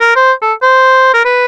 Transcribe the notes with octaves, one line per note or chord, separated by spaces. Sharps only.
A#4
C5
A4
C5
A#4
B4